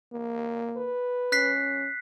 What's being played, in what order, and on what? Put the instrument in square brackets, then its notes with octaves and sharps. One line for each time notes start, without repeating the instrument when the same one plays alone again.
[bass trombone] A#3
[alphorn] B4
[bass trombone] C#4 [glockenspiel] F#6 B6 C7